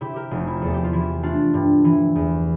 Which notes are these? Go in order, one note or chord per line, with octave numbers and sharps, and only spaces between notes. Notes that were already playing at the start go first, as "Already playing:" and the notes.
C3 E4 G4
G4 A#4
F1
E4
E2 A4
G4
F4
E3 E4
A3 D4 F4
G2
E3
E2